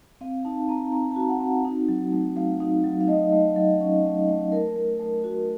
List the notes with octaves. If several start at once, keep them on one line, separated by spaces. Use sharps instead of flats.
C4 F5
D#4 A5
C4 A#5
C4 A#5
A5
F#4
F#5
C4
D#4
F#3
A3
A3 F5
D#4
F#3
F5
A3 D#5
A3
F#3
C#4
A3
A3
A3 A#4
A3
A3
F#4